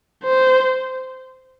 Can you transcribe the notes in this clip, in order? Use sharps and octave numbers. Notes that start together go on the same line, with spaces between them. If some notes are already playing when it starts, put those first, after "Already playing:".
C5